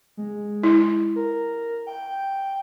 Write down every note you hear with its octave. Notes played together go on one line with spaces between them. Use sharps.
G#3
E4
A#4
G5